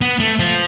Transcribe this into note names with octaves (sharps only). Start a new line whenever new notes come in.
B3
A3
F3